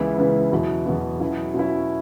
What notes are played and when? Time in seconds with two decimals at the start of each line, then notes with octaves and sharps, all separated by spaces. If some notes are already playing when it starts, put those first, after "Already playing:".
Already playing: C#2 C#3 E3 B3 E4
0.18 C#2 C#3 E3 B3 E4
0.52 E2 B2 F#3 B3 E4
0.86 E2 B2 F#3 B3 E4
1.20 B2 F#3 C#4 E4
1.54 B2 F#3 C#4 E4